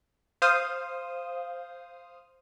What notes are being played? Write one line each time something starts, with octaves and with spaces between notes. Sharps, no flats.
C5 F5 D#6